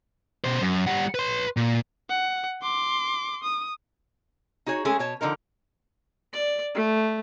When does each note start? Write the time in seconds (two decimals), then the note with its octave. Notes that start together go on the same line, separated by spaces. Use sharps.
0.44 B2 C5
0.61 F#2
0.87 G3 F#5
1.15 B4 C6
1.57 A#2
2.10 F#5
2.62 C6 D6
3.43 D#6
4.66 D#4 F#4 G#4 C#5
4.85 G#3 A3 C#4 G#4 A4
4.99 B2 C#5 A5
5.21 D3 F3 D#4 A#4
6.33 D5
6.75 A3